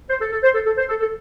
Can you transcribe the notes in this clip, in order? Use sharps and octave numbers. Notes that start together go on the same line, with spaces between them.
C5
A4
A4
C5
A4
A4
C5
A4
A4